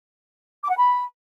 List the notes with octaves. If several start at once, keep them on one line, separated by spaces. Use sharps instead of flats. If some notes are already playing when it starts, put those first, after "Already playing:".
D6
F#5
B5